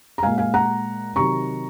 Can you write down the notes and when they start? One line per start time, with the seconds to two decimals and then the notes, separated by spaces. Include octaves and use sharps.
0.18 A#5
0.23 A#2 G#3 F5 G#5
0.38 F5 G#5
0.54 F#5 A#5
1.16 C3 D#3 F#3 A#5 C#6